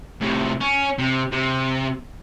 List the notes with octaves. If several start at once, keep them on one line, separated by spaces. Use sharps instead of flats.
A2 C3
C#4
C3
C3